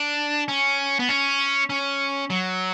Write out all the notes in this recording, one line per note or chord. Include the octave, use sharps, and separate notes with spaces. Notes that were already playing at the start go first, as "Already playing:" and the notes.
Already playing: D4
C#4
B3
C#4
C#4
F#3